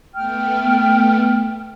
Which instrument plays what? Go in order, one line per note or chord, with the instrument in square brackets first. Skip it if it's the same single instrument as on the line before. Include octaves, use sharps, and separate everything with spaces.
[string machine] A3 B3 [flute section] G5 F6